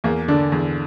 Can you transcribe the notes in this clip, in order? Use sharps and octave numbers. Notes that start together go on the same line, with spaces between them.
E2 A#3
D3 D4
E2